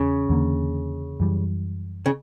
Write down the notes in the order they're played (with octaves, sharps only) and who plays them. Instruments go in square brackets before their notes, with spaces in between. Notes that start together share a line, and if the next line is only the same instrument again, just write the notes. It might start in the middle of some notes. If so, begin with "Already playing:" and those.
Already playing: [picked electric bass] E2 [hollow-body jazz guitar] C#3
[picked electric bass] E2 D3 A#3
F#2 E3 G3
[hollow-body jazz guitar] C#3